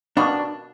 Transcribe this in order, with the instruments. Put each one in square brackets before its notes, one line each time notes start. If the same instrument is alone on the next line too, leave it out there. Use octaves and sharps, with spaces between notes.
[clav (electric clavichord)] B2 G3 A#3 [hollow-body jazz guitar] D4